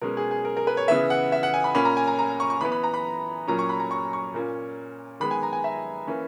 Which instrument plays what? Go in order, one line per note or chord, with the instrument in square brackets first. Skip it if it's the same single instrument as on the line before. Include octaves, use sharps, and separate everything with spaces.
[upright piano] B2 G#3 C#4 A#4
G#4
G#4
A#4
A#4
B4
C#5
C#3 E3 B3 E5
F#5
E5
F#5
G#5
B5
A#2 A#3 C#4 B5
A#5
G#5
A#5
A#5
C#6
C#6
E3 B3 B5
B5
A#5
B5
A#2 F#3 A#3 C#4 A#5
C#6
B5
A#5
C#6
C#6
A#2 A#3 C#4
D#3 G#3 B3 B5
G#5
A#5
G#5
E5
E3 A#3 C#4